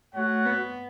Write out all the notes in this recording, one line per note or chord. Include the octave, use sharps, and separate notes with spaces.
A3 F#4 C#5 F#5
B3